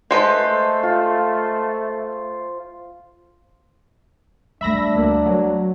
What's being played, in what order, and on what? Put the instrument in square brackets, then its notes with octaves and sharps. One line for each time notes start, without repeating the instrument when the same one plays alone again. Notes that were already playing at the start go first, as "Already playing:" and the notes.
[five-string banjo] G#3 A4 B4 [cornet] A3 [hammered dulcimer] C5
[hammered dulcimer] F4
[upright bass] G3 A3 [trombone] D4 [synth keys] E5 B5 A#6
[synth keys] D2 A#3
F#3